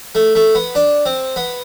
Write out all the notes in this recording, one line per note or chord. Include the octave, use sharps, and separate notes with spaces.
A3
A3
B3
D4
C4
B3